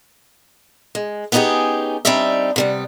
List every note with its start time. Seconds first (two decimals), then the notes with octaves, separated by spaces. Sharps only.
0.95 G#3
1.32 B3 C#4 D#4 F4 G4 G#4
2.05 G3 C4 D4 D#4 D5 E5
2.56 C3 G3 B3